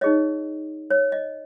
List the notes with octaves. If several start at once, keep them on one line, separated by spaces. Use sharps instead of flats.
D#4 G#4 C#5 D#5
C#5
D#5